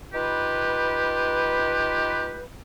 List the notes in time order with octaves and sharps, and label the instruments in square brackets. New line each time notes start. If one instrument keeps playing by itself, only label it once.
[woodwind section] D#4 F4 G4 B4